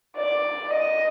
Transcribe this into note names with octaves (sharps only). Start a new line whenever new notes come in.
D5
D#5